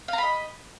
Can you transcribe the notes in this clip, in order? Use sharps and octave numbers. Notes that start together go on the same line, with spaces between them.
D#5 F5 A#5 B5